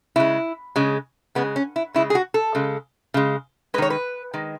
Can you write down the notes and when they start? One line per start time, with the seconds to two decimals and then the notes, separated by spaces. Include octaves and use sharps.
0.16 C#3 G#3 E4
0.76 C#3 G#3
1.35 C#3 G#3 B3
1.56 C#4
1.76 E4
1.94 C#3 G#3 E4
2.10 G#4
2.15 F#4
2.34 A4
2.55 C#3 G#3
3.14 C#3 G#3
3.74 G#3 B4
3.78 D#3 C#5
3.90 B4
4.34 D#3 G#3